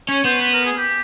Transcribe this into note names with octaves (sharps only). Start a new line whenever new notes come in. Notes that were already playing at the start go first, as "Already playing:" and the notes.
C#4 C#5
B3 C5
B4
A#4
G#4
G4